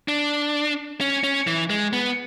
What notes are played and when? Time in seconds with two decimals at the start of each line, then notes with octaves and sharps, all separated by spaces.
0.08 D4
1.01 C#4
1.24 C#4
1.47 E3
1.70 G#3
1.93 B3